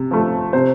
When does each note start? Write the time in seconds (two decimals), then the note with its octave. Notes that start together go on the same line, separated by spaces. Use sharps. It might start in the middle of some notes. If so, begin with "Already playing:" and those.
Already playing: C3
0.11 F3 A3
0.53 C3 C5